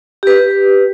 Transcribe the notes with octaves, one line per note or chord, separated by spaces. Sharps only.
G4 B4